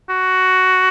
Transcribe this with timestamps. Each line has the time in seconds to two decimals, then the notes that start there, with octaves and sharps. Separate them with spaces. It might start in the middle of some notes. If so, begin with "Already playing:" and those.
0.09 F#4